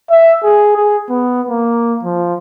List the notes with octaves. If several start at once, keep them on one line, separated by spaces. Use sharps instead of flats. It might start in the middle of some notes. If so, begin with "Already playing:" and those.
E5
G#4
G#4
B3
A#3
F3